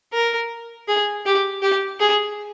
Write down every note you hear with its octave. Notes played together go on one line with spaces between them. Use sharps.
A#4
G#4
G4
G4
G#4